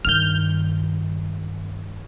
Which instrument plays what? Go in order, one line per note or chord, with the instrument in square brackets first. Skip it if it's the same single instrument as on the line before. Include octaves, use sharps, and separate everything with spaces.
[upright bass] G2 D#3 [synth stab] F6 G6